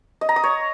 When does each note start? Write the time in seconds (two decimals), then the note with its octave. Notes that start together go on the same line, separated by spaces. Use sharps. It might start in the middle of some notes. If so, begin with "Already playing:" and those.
0.21 D#5
0.29 A#5
0.36 D#6
0.44 C#5